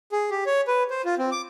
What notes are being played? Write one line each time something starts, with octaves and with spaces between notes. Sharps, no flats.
G#4
G4
C#5
B4
C5
F4
C4
D6